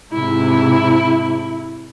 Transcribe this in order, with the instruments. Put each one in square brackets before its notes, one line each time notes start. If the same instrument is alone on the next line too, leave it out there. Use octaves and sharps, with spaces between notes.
[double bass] G#2 C3 [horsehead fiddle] E4